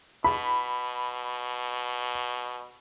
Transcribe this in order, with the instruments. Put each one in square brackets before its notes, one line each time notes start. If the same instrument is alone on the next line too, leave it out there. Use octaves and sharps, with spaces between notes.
[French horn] B2 [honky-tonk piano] B5